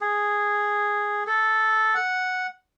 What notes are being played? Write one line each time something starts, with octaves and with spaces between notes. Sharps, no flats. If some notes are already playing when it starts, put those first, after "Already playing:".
G#4
A4
F#5